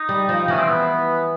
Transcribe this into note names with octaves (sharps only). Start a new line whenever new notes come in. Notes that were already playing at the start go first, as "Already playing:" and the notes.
Already playing: D#4
G3
F3
E3 C#4
C4
B3